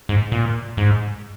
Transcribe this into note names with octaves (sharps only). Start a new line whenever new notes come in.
G#2
A#2
G#2